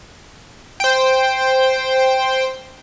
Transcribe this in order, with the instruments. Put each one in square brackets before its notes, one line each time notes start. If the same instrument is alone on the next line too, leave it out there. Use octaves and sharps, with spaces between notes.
[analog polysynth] C5 G5